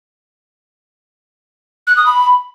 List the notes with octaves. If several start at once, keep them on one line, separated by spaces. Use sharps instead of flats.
F#6
D#6
B5